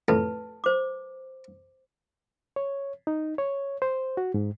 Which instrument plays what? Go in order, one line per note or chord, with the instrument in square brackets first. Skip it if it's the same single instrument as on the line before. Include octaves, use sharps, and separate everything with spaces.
[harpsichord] F2 A2 [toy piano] B4 A5
[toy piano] C5 D6
[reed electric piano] C#5
D#4
C#5
C5
F#4
G#2